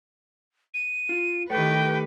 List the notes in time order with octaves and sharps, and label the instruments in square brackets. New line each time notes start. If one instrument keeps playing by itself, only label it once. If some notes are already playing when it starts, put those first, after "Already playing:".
[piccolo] D#7
[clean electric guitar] F4
[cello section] D#3 G4 B4 [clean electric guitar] A3 A4 C#5 [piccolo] G5